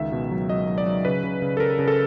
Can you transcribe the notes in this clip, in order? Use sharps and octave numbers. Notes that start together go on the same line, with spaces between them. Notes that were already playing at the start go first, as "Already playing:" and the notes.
Already playing: C#2 D#3 E5
B2
F#3
F#3 D#5
F#3
D5
F#3
C#3 B4
C#3
C#3
A4
C#3 A#4
C#3
A4